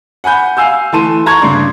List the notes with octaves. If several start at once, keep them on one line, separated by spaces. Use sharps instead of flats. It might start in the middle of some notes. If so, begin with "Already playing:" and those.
F#5 G#5 B5 G6
F5 G#5 E6 G6
E3 A3 A4 A5 C6 D#7
A5 A#5 C#6 G#6
G2 C#3 D4 C6